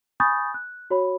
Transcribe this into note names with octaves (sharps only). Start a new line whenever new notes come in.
G#5 B5 C#6 D#6 G6 A6
F#6
F#4 C#5 B5